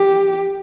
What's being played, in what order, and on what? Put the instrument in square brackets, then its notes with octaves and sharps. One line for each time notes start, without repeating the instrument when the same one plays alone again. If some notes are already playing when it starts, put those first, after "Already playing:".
Already playing: [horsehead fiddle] G4